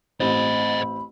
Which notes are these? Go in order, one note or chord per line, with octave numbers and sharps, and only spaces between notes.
A1 C4 C5 D#5 B5